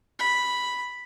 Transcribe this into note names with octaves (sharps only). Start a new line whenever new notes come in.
B5